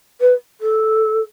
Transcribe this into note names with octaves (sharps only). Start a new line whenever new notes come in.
B4
A4